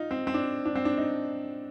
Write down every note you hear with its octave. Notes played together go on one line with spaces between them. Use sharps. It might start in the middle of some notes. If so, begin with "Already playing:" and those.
Already playing: D#4 F4
C4
C4
D4
D4
C4
D4
D#4